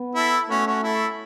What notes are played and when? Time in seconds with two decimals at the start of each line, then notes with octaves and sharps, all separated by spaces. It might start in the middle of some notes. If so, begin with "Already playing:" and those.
Already playing: B3
0.15 E4 A4
0.49 A3 C#4 F#4
0.67 C#4 F#4
0.83 E4 A4